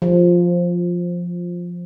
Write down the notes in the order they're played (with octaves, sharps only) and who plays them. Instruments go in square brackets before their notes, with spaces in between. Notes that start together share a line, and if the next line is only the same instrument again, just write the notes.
[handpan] F3